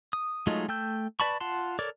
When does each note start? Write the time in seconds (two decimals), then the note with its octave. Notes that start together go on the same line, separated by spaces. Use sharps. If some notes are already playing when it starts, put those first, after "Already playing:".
0.13 D#6
0.47 F#3 G#3 A3 D#4 F4
0.69 A3 G5 E6 G6
1.20 B4 D5 A5 B5 C#6
1.40 F4 F#5 A5 C6
1.79 A4 A#4 C#5 D5 D6